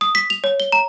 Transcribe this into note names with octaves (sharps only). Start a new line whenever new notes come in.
D#6
B6
F7
C#5
G7
A#5